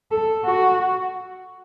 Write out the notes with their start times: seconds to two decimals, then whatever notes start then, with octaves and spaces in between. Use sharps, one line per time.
0.11 A4
0.45 F#4